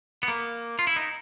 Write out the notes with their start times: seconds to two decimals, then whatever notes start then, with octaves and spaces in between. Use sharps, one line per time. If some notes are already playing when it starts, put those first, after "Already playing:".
0.23 B3
0.28 A#3
0.79 F4
0.87 E4
0.96 D#4